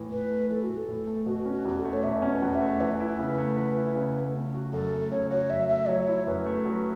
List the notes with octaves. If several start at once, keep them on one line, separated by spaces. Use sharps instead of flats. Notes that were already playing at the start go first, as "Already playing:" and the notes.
Already playing: A2 E3
A2 B4
A3
E3 A4
F#4
A2
A4
A2
A3
B2 F#4
C#4
F#4
E2 F#4
A4
A3
C#5
B2 E5
C#4
B4
E2
E5
A3
E3 B4
E4
C#3
A3
E3
E4
C#3
A3
C#3
F#4
F#2 A4
A3
C#3 C#5
F#4 C#5
F#2 E5
A3 E5
F#3 C#5
E4
F#2 B4
A3
F#3